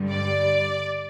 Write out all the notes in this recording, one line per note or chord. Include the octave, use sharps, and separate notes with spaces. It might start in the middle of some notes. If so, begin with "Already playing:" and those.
Already playing: G2 D3 G3
D5